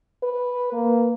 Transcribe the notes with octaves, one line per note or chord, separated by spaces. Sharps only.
B4
A#3